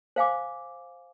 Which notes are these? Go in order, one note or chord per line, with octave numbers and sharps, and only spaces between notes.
C5 F5 G#5 D6